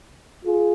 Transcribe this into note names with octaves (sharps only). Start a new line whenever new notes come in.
F4 G#4